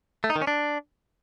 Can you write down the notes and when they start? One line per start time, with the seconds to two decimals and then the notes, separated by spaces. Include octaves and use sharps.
0.24 A3
0.30 D#4
0.36 D#3
0.42 C#4
0.47 D4